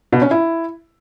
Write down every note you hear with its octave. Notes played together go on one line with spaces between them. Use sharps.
B2
C#4
E4